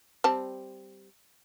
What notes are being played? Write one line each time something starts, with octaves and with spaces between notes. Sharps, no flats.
G3 C4 A5